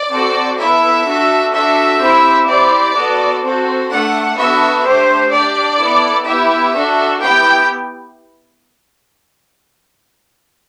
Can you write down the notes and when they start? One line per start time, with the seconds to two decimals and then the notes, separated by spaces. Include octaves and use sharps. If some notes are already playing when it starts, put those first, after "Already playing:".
Already playing: D5
0.11 C4 F#4 A4
0.58 B3 E4 A4 E5
1.05 D4 F#4 A4
1.53 D4 F#4 A4 E5
2.01 C4 E4 G4
2.48 C4 E4 G4 D5
2.95 B3 F#4 A4
3.42 C4 F#4 A4
3.90 A3 D4 A4 F#5
4.37 B3 D4 F#4 A4 E5
4.84 A3 D4 G4 C5
5.32 D4 G4 D5
5.80 B3 E4 A4
6.26 B3 E4 G4 E5
6.74 D4 F#4 A4
7.21 B3 E4 G4 G5